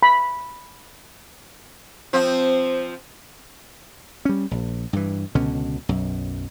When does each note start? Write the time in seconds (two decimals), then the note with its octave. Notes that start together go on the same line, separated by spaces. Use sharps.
0.03 B5
2.13 F3 C4
4.25 G3 C#4
4.51 A#1
4.93 G2 E3
5.35 C#2 B2 D3 C#4
5.89 B1 F#2